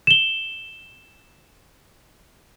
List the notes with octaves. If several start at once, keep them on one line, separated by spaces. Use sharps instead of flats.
E7 G7